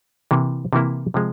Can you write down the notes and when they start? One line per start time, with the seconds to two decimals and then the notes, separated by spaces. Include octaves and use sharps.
0.31 C3 E3 A#3 E4
0.73 C3 E3 A#3 E4
1.14 C3 F3 G#3